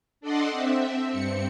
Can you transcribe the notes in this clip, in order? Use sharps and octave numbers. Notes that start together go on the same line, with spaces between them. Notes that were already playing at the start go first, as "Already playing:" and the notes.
D4 A4 D5 D#5 F#5 C6
C4 E5
G2 C4 C#7